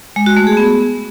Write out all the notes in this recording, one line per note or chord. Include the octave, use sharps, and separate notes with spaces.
G#3
F#4
A3
G#4
B3